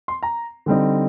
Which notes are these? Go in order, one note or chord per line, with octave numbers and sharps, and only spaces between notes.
C6
A#5
D3 G3 C4 D#4